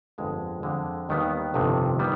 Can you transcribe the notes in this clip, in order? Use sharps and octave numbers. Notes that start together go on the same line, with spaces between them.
G1 F2 D3 G#3
F2 D3 G#3
D#2 D#3 G3 B3
G1 F2 C3 D#3
D#3 G3 B3